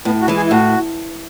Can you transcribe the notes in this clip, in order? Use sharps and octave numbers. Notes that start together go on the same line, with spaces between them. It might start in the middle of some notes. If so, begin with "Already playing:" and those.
A2 B3
F#4
E3 G#3
G#4
E4
A2 F#4